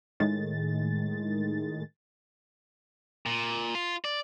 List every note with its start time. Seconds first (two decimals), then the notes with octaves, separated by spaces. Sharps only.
0.20 A2 D#3 G#3 A6
3.26 A#2
3.75 F4
4.05 D5